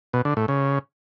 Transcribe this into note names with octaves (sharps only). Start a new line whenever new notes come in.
B2
D3
A2
C#3